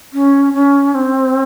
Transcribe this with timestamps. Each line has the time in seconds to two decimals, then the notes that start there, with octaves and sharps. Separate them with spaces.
0.13 C#4
0.54 C#4
0.94 C4